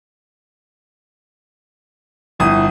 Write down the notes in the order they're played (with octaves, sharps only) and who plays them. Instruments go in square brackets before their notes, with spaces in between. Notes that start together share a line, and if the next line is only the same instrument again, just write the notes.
[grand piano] G1 D#6 [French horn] E4